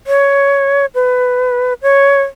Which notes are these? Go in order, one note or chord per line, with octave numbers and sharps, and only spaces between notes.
C#5
B4
C#5